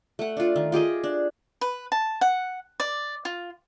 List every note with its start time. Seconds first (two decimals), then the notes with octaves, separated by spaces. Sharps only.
0.19 A3 F#5
0.37 D4 F4
0.56 D#3
0.72 F4 G4 G#4 D#5
1.04 D4
1.61 B4
1.92 A5
2.21 F#5
2.80 D5
3.25 F4